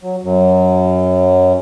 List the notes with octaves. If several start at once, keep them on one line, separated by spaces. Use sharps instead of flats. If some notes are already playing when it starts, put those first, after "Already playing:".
F#3
F#2 F#3